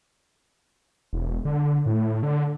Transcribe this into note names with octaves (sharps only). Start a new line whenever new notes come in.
E1
D3
A2
D3